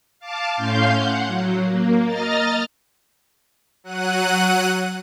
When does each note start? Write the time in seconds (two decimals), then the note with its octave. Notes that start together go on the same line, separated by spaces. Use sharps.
0.19 F5 A5 D6
0.56 A2 C#4 F5 C6 G6
0.95 F#5
1.26 F#3
1.64 A#3
2.05 D#5 A#5 F6 A6
3.84 F#3 F#5 F#6 D#7